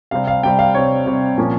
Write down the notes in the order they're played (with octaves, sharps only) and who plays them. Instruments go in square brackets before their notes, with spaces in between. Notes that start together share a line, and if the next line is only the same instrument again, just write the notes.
[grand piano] C3 G3 C4 F5
F5
C3 G3 C4 G5
F5
C3 G3 C4 C#5
C3 G3 C4
A#2 F3 A#3 C#4